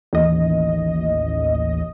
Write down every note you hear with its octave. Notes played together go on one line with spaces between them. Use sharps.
A1 D#2 D#5